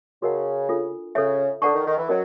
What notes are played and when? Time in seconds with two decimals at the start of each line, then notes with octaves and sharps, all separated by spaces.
0.22 C#3 F#4 A#4 D#5 F#5 A5
0.69 D4 F4 A4
1.15 C#3 A4 C#5 E5
1.62 D3 A4 D5 F#5 A5 C#6
1.74 D#3
1.85 D#3
1.97 E3
2.09 F#3 C#4 F#4 A#4 D#5